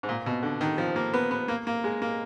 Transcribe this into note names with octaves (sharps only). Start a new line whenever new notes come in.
G#2
A#2
B2
D3
D#3
F3
A#3
B3
B3
A#3
A#3
G#3
A#3